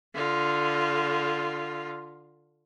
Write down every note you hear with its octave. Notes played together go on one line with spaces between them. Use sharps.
D3 F4